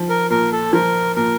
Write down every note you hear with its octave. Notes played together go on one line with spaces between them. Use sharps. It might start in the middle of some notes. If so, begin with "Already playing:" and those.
Already playing: F3
A#4
A#2 A#4
A4
F3 A#4
A#2 A#4